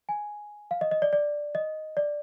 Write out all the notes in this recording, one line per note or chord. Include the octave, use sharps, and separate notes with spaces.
G#5
F5
D#5
D#5
D5
D5
D#5
D5